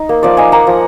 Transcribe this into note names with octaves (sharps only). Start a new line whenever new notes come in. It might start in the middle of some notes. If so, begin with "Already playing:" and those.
Already playing: D#4
A#3
F3 D5 F5
D#4 F5 G#5
A#3 F#5 A#5
F3